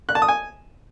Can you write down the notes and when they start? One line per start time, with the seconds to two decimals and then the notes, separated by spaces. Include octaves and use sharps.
0.09 F#6
0.15 A5
0.22 D#6
0.28 G#5